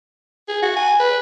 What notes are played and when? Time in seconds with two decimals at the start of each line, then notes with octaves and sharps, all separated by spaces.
0.48 G#4
0.62 F#4
0.76 G#5
0.99 B4